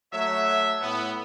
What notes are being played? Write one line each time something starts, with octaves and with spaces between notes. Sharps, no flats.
F#3 A3 C#5 E5
A2 B3